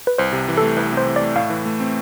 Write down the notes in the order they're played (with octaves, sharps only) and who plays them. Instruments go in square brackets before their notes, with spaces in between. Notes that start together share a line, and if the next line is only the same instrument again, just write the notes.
[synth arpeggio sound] B4
[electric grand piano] C2 [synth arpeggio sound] C5
[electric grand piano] C3
E3
[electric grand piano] A3 [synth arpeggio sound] A4
[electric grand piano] C2 [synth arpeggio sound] B4
[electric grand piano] C3 [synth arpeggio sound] C5
[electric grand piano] E3
[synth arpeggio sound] D5
[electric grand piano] A3
[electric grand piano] A2 [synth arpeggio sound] F5
[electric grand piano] E3
A3
C4